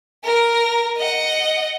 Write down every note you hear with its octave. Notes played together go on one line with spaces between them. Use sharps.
A#4
D#5 F#5